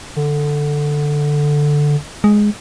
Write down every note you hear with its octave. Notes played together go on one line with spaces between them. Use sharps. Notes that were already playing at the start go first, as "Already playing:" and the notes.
D3
G#3